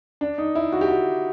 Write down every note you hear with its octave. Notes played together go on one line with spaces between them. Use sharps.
D4
D#4
E4
F#4
G4
F#4